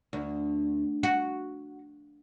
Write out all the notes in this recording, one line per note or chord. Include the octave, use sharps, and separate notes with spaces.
D2
F#4